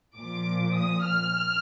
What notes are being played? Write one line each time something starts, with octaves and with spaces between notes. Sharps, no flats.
A#2 F3 D6
D#6
F6